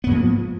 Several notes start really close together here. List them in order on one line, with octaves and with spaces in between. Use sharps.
B3 G#2 A#3 F3